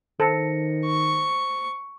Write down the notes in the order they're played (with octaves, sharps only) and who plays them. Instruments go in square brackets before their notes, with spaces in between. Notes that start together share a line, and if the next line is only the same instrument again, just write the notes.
[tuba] D#3 [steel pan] A4 [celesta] C5 A#6 C#7
[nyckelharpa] C#6